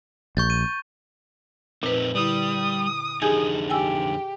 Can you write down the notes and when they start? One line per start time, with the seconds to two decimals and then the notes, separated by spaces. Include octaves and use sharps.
0.37 A#1 C#6 G6 A6
0.50 D#7
1.83 F2 A#2 C4 D#4 B4
2.15 D3 G3 E4 D#6
3.22 F2 D3 D#4 G4 G#4 G#5
3.70 G4 G5 G#5 E6